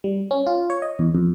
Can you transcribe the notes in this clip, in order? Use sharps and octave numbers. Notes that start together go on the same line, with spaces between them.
G3
C#4
F4
C#5
D#5
E2
F2